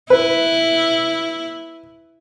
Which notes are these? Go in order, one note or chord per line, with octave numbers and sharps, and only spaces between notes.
E4 B4